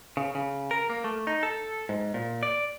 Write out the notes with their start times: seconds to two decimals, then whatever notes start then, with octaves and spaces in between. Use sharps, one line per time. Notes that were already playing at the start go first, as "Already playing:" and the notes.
0.17 C#3
0.35 C#3
0.71 A#4
0.90 A#3
1.04 A3
1.27 D#4
1.43 A4
1.89 G#2
2.14 A#2
2.43 D5